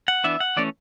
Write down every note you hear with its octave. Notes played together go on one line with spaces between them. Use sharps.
F#5
E3 B3 D4 E5
F#5
E3 A3 C#4 D5